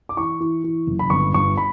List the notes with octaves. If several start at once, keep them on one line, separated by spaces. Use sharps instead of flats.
D6
E3 C#6
E3
E3
F#1
B5
G1 C#6
G1 C#6
B5